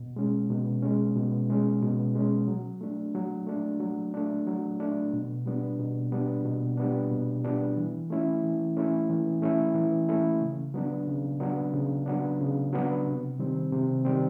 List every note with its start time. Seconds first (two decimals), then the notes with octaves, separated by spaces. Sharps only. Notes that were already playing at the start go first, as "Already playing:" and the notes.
Already playing: B2
0.16 G#3 C#4
0.50 B2
0.82 G#3 C#4
1.16 B2
1.50 G#3 C#4
1.83 B2
2.15 G#3 C#4
2.48 F#3
2.81 A3 D4
3.15 F#3
3.47 A3 D4
3.80 F#3
4.14 A3 D4
4.47 F#3
4.80 A3 D4
5.13 B2
5.46 G3 B3 D4
5.79 B2
6.12 G3 B3 D4
6.45 B2
6.77 G3 B3 D4
7.12 B2
7.44 G3 B3 D4
7.77 E3
8.10 A3 C#4 E4
8.44 E3
8.77 A3 C#4 E4
9.10 E3
9.42 A3 C#4 E4
9.75 E3
10.09 A3 C#4 E4
10.41 C#3
10.74 F#3 B3 D4
11.07 C#3
11.40 F#3 B3 D4
11.73 C#3
12.06 F#3 B3 D4
12.40 C#3
12.73 F#3 B3 D4
13.06 C3
13.39 D#3 G3 C4
13.72 C3
14.05 D#3 G3 C4